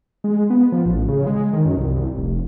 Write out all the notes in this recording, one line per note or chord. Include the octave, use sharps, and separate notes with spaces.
G#3
B3
F3
A1
C#3
G#3
D#3
F#2
C2
F1